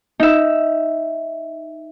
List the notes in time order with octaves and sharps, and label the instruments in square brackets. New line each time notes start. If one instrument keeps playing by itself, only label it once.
[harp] D#4 E5